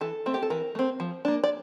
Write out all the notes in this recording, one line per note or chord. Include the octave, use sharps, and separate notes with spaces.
E3 A4
A3 C4
G4
A4
E3 A#4
A3 C4
F3
A#3 D4
D5